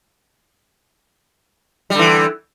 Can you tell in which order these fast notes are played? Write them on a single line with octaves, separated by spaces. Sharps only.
G3 D3 E3